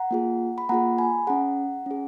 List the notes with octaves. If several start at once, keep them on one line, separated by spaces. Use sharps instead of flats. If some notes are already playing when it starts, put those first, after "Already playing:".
Already playing: F#5 A#5
A#3 F4 G#4
B5
A#3 F4 G#4 F#5 A#5
G#5 B5
C#4 G#4 F#5 A#5
C#4 G#4